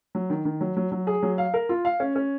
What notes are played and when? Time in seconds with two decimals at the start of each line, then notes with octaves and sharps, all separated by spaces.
0.15 F#3
0.30 D#3
0.45 D#3
0.61 F#3
0.77 F#3
0.92 F#3
1.07 G#4
1.23 F#3
1.38 F5
1.54 A#4
1.69 F4
1.85 F5
2.00 C#4
2.16 C#4